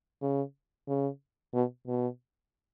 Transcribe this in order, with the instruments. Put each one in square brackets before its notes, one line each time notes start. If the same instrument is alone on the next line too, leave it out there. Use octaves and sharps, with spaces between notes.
[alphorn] C#3
C#3
B2
B2